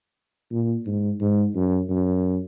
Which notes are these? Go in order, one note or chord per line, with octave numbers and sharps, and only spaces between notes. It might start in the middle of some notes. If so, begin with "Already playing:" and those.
A#2
G#2
G#2
F#2
F#2